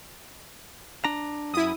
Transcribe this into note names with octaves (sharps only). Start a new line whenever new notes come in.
D4 A#5
F#2 E4 D#6